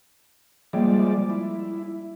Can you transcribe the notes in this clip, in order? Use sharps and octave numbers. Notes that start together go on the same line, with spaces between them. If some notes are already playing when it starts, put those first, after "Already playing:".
F3 G3 G#3 A#3 D5
E4